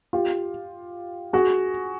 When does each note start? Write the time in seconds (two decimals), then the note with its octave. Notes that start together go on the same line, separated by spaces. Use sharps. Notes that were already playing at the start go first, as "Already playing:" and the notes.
0.13 F4 G4
1.33 F#4 G#4